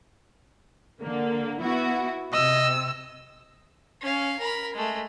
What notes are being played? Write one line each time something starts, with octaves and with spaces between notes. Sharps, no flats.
D3 A#3
B3 E4 F#4
C3 D#5 E6
C#4 F5
A#4 B5
G#3 A3